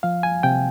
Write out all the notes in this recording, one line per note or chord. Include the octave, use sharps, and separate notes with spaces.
F3 F5
G#5
C3 G5